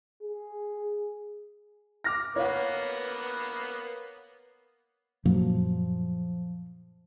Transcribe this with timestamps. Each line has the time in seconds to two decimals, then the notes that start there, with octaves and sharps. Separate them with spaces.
0.23 G#4
2.04 D6 F6 A#6
2.36 A#3 B3 B4 C#5 F5 F#5
5.25 F#2 A#2 F3 F#3 A#3